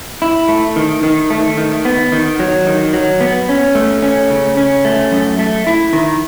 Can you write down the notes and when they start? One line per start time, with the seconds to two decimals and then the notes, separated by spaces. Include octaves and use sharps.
0.22 E4
0.48 A3
0.76 D#3
1.03 D#3
1.30 A3
1.58 D#3
1.85 B3
2.12 D#3
2.40 F#3
2.67 D#3
2.93 F#3
3.21 B3
3.49 C#4
3.75 A3
4.03 C#4
4.30 C#3
4.57 C#4
4.85 A3
5.12 F#2
5.39 A3
5.67 E4
5.93 D#3